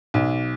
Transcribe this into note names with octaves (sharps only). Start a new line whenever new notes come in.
B1